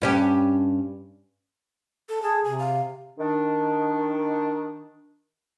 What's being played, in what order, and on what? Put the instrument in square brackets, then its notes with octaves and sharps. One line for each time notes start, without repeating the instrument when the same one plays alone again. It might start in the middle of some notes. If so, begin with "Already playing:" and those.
[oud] G2 C#4 G4
[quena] A4
[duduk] G#4 [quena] A5
[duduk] C3 [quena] G#5
[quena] F5
[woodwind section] D#3 D4